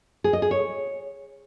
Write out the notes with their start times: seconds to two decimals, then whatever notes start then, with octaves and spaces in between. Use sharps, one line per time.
0.24 G#4
0.33 D#5
0.42 G#4
0.51 C#5